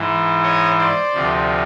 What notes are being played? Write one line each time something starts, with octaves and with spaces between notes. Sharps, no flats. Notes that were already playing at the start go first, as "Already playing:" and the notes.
Already playing: G#2 E3
C#5 D#5
C5 D5
D2 C3 F3